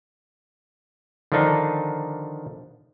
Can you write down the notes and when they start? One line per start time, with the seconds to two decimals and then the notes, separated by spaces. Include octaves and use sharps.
1.32 D3 D#3 F3 D4 D#4